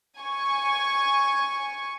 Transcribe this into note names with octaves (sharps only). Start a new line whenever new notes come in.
G#5 C#6